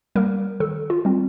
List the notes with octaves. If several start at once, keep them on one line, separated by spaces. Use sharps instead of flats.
G3 A#3 A#4
D#3 A4
F4
G3 C4